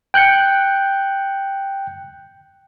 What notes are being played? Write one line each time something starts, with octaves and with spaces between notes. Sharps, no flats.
G5 F#6 G6 C#7